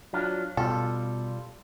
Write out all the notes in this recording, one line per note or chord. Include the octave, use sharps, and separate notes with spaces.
F#3 D4 F4
B2 G3 F4 A4